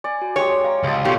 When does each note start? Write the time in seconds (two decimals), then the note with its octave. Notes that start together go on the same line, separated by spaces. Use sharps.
0.04 D5 G#5
0.22 F#4
0.36 G#3 G4 C#5
0.64 F5 A#5
0.83 C#2 D#5 F5 A5 C6 D#6
1.05 B2 F4 G4 A4 A#4 C#5